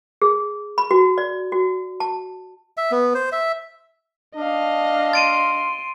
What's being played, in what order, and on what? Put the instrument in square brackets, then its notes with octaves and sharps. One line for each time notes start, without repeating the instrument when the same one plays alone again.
[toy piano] G#4
B5
F#4
D5
F#4
A5
[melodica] E5
B3
C5
E5
[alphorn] D4 [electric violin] D#5 F5
[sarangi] C6 [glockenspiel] A6 D7 D#7